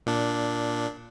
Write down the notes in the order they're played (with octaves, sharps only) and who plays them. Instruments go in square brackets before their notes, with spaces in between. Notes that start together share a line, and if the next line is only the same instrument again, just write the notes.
[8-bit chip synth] A#2 D4